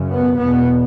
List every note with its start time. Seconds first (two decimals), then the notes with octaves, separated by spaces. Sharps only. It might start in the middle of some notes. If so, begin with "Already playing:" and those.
Already playing: F#2 C#3
0.11 B3
0.40 E2 B2 B3